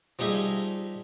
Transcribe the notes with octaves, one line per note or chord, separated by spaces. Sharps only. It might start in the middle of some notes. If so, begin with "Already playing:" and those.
F3 G3 D#4 G#4 E5